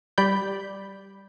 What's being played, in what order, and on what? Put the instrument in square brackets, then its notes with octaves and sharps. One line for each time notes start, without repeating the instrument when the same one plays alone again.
[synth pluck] G3 D5 B5 G6